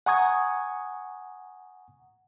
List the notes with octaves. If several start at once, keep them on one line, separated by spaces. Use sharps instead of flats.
F#5 G#5 A#5 C#6 D#6 G#6